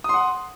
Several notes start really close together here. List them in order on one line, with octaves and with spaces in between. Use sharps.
D#6 C6 F#5